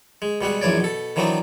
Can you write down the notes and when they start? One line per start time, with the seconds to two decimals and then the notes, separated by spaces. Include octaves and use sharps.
0.22 G#3
0.41 B2 G3 G#3 F#5
0.61 A#1 F#2 E3 C#5 D5
0.80 B2 A4
1.16 D#3 E3 F#3 B3 C4 D4